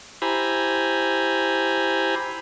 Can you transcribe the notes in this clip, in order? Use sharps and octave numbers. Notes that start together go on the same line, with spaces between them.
E4 G4 C5 G#5 A#5 B5